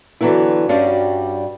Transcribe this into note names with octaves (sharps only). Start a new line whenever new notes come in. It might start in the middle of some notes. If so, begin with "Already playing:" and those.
D3 E3 F#3 B3 E4
G2 G3 C#4 D4 F#4